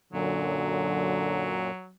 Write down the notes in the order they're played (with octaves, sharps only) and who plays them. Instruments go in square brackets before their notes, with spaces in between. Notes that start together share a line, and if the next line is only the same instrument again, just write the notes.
[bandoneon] F#2 A#2 [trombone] D3 [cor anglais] F#3